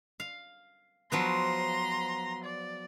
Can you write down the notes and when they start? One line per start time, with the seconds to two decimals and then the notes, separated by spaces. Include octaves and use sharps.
0.20 F5
1.12 F3 F#3 B3 A#5 C6
2.44 D5